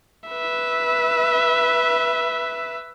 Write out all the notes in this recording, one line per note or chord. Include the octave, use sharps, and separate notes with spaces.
B4 E5